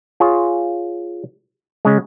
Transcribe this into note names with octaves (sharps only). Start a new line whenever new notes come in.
F4 G#4 C#5
C#3 G#3